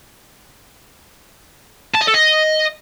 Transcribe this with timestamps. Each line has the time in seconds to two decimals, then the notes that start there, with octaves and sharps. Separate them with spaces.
1.94 A5
2.01 D#5
2.07 A4
2.14 D#5